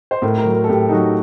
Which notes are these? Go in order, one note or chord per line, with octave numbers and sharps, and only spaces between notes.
C5
A2 A#4
A#4
F#3
A#4
A4
A2 G4
D#4
F#3 F#4